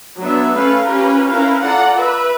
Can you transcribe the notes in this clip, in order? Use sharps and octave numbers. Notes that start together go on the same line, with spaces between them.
F#3 B3 D4 E5
A3 C#4 A4 B4 F5
C#4 F4 G4 A#4 B4
C#4 E4 A#4 B4 F5
F4 A4 D5 F#5 A#5
B4 E5